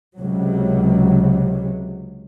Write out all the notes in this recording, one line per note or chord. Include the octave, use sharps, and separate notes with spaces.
C#2 C3 F#3